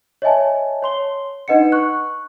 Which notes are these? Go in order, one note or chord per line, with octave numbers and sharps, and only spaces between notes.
C#5 D#5 E5 G#5 A5
C#5 C6 G7
D4 D#4 B4 D#5 F#5 C#7
C#6 F#6